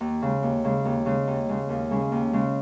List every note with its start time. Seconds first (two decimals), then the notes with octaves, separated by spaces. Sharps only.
0.01 D#2
0.22 C#3 G#3
0.43 D#2
0.64 C#3 G#3
0.85 D#2
1.06 C#3 G#3
1.27 D#2
1.49 C#3 G#3
1.69 D#2
1.91 C#3 G#3 C#4
2.12 D#2
2.33 C#3 G#3 C#4